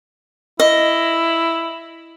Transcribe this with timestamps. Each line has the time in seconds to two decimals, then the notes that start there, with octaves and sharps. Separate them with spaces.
0.60 E4 D#5